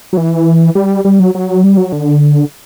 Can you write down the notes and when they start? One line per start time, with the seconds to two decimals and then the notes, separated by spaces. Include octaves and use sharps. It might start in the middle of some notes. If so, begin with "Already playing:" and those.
0.13 F#3
0.17 E3
0.75 G3
1.05 G3
1.20 F#3
1.35 F#3
1.64 G3
1.77 F#3
1.92 D3